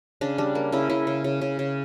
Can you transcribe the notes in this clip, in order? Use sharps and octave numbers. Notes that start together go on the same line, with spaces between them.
C#3 D4
G3 D4
A#3
C#3 E4
C#3 E4
C#3
C#3
C#3
C#3